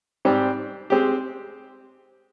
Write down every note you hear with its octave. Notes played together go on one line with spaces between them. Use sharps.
G#2 G3 C4 G4
G#3 C4 G4